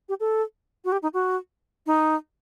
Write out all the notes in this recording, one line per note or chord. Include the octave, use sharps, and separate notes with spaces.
G4
A4
F#4
G4
D#4
F#4
D#4